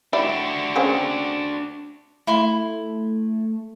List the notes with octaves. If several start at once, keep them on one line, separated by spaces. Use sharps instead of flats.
G3 D4 E4 F#4
C4 C#4 G#4
A3 E4 C6